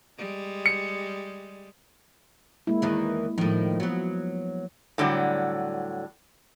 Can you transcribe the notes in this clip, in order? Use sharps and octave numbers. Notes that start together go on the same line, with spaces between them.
G3 G#3
C#7
G#3 A#3 E4
E2 D#3 E3
A2 D#3 F3
F#3 B3
A2 D3 F#3 G3